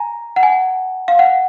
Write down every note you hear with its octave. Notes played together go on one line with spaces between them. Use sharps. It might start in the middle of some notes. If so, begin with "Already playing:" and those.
Already playing: G#5 A#5
F#5
G#5
F5
F#5